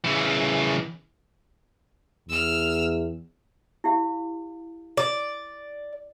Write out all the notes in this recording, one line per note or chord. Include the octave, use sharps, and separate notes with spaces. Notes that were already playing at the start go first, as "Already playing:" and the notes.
C#3 E3
E2 E6 F6
E4 G4 F5
D5